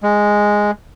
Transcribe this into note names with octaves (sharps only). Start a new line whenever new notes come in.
G#3